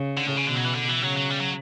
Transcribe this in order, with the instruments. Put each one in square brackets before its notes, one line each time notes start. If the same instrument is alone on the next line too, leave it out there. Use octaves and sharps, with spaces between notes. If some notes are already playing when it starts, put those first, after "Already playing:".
Already playing: [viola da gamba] C#3
[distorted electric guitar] D3
A2
C#3
[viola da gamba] B2 [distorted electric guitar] D3
[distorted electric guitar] F#3
E3
D3
E3
[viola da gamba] C#3 [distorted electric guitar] F#3
[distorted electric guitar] F#3
G3
F#3